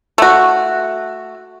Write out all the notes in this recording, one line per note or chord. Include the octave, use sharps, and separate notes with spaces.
A3 F#4